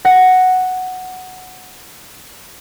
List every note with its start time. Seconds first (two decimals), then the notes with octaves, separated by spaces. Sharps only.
0.05 F#5 A#6